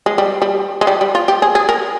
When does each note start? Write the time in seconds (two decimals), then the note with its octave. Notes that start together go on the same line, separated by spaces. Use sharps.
0.06 G#3
0.18 G3
0.42 G3
0.81 G#3
0.87 G3
1.01 G3
1.15 F4
1.28 G4
1.42 G#4
1.55 G#4
1.69 A#4